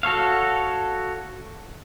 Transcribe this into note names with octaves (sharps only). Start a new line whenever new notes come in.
F#4 A4 C#5 F5